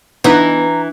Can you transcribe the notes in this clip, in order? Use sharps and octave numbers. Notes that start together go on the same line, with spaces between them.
E3 B3 D4 D#4 B4 A#5